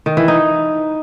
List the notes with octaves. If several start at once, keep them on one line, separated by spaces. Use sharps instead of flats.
D#3
E3
D#4